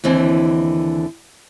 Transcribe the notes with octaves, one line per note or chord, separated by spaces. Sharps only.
D#2 D3 E3 C4